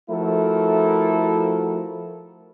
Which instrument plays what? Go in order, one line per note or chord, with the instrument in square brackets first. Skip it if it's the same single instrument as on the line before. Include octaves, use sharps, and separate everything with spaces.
[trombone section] F3 A3 E4 F#4 A4 A#4